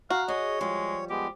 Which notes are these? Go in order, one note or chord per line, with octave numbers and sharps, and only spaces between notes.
F#4 F5 A#5
G#4 C#5 D#5
F3 G3 G#3
G#3 B3 G4